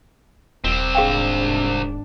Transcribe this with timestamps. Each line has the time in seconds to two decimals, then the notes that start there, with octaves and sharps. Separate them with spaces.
0.64 D#1 C2 C4
0.95 G#1 D4 G#4 F5 G5